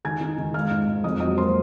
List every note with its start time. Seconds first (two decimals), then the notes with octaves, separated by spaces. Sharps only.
0.05 D#3 G#5 G#6
0.21 D#4
0.38 D#3
0.54 G#3 F5 F6
0.71 G#2
0.88 G#2
1.04 F2 D#5 D#6
1.20 F#3 D#5 D#6
1.37 A#3 C5 C6